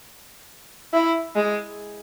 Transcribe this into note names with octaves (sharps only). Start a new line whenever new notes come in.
E4
G#3